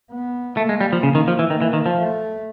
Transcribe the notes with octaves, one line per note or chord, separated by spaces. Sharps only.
B3
A3 A#3
G#3
G3
F3
C#3
D#3
F3
E3
D#3 A#3
E3
D#3
F3
A3